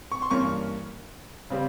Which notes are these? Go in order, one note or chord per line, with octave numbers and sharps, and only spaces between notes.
C#6
C6
G2 E3 A#3 C#4 C#6
C#3 G3 C4